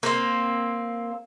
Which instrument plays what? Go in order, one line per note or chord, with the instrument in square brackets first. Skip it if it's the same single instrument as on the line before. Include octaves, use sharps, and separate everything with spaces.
[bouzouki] A#3 C4